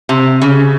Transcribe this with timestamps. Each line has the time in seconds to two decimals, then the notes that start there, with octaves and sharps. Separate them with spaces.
0.09 C3
0.42 C#3